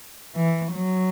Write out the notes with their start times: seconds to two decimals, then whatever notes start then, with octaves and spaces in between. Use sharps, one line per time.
0.36 E3
0.74 F#3